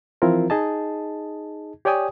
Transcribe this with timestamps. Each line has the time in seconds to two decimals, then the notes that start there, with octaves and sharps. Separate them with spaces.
0.22 E3 F3 C4 E4 F4 A#4
0.50 D#4 G#4 D#5 A5
1.85 G4 C#5 D5 G5 G#5 D#6